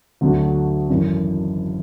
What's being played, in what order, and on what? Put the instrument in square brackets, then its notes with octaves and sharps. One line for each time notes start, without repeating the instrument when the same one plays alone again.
[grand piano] D2 D3 F#3 A3 D4
G#1 F#2 E3 D4